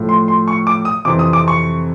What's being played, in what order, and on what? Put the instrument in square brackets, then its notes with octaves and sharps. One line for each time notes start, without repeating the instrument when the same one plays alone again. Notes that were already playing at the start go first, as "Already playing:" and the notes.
Already playing: [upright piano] A2 F3
C6
C6
C#6
D6
D#6
F2 C3 E3 D6
D#6
D6
C#6